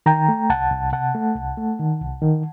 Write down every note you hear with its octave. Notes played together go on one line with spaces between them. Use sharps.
D#3 G5 A#5
A3
C2 F#5 A5
C2
C3 F#5 A5
A3
C2
A3
D#3
C2
D#3